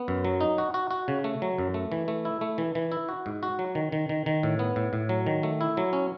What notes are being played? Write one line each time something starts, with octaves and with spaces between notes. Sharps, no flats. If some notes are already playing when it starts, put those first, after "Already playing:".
Already playing: B3
F#2
F#3
D#4
F#4
F#4
F#4
C#3
A3
F#3
F#2
A3
E3
A3
E4
A3
E3
E3
E4
F#4
G#2
F#4
F#3
D#3
D#3
D#3
D#3
A2
B3
A2
A2
F#3
D#3
A3
E4
F#3
C#4